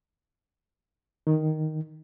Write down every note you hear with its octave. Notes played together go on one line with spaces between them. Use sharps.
D#3